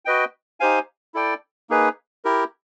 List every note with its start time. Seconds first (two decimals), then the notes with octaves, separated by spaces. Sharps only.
0.05 F#4 B4 D#5 G5
0.60 D#4 G4 C5 F5 G#5
1.14 E4 A4 D5 G5
1.70 A#3 D#4 G#4 B4
2.25 E4 G4 A#4